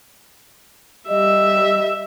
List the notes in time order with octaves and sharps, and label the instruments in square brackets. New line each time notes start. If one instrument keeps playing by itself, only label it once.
[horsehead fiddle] G3 [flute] D#5 [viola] E5